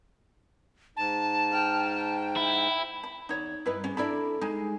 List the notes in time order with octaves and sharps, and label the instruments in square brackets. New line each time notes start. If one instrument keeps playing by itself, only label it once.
[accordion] G#2 [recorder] A5
[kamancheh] G5 F6
G5
[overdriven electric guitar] E4
[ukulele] B5
[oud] E2 [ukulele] D#4 C#5
[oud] G2 D#4 [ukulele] E4 B4
[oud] G#2 [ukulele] C#4
[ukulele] D4 E4 B5 [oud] A4 A#4 D5
[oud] G#3 [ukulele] D#4 G#5